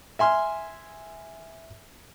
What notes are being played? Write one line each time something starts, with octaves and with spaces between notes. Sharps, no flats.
E5 G#5 C6 F6